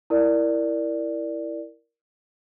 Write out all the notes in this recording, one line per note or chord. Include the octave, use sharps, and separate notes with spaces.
E4 A#4 D5